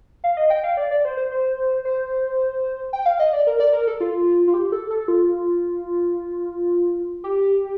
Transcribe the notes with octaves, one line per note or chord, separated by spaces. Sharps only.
F5
D#5
G5
F5
D5
D5
C5
C5
C5
C5
G5
F5
D#5
D5
A#4
D5
A#4
A4
F4
F4
G4
A4
A4
F4
G4